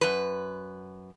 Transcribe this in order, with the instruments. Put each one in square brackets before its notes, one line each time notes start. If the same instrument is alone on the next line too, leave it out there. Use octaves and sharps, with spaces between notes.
[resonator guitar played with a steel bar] F#2 B4